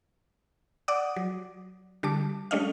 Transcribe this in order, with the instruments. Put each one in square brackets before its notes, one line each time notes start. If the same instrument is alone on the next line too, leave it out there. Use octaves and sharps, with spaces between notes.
[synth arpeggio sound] D5 F#5 D6 D#6
F#3
D3 G3 A5 D6
G3 A3 C#4 D4 D#5 F5